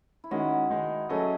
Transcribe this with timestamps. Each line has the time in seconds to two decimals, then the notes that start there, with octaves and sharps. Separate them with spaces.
0.24 E4
0.31 D#3 G#3 C#4 F#4
0.70 D#3 G#3 D#4
1.09 F#3 A3 C#4 G#4 A4 D#5